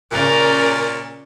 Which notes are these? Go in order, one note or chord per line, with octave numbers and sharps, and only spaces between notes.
A#2 C#3 C#4 A#4 D5